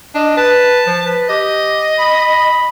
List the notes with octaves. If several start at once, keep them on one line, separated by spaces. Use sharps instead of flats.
D4 D#5
B4 A5
F3
B4
G4 D#5
B5